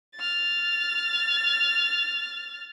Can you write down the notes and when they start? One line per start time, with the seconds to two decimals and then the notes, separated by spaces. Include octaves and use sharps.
0.15 F6 A6